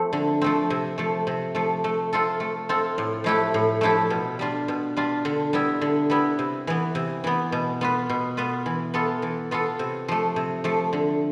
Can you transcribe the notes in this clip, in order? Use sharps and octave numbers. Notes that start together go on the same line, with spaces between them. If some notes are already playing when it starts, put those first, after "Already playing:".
Already playing: F3 A3 C4
D3
F3 A3 C4
C3
F3 A3
C3
F3 A3
A3
C4 F4 A4
A3
C4 F4 A4
A2
F3 A3 E4 G4
A2
F3 A3 E4 G4
B2
G3 D4 F4
B2
G3 D4 F4
D3
G3 B3 E4
D3
G3 B3 E4
C3
E3 B3
C3
E3 B3
B2
B3 F4 B4
B2
B3 F4 B4
E3
B3 F4 A4
E3
B3 F4 A4
C3
F3 A3
C3
F3 A3
D3